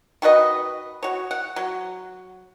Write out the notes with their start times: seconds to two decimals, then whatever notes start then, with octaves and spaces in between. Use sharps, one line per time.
0.22 D#3 F#4 B4 D#5
1.03 F#4 C#5
1.31 F#5
1.56 F#3